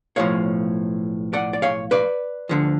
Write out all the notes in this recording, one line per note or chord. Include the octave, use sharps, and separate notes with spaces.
B1 A2 F3 C#5 F5
D5 F#5
D5
C#5 F5
B4 D5
D2 D3 F3